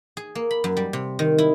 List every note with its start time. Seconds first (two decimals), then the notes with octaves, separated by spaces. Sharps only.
0.17 G#4
0.35 A#3
0.51 B5
0.64 F#2
0.77 G3
0.93 C3
1.19 D#3
1.38 E4